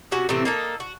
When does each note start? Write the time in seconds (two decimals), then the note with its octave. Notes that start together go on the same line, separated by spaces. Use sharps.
0.11 C3 C#4 F#4 G#5
0.29 A2 C3 E3 C4
0.45 A#3 D#4 A4
0.80 F#4